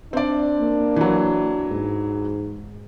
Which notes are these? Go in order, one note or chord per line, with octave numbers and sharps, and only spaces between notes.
C4 D4 D5
A#3
E3 F#3
G#2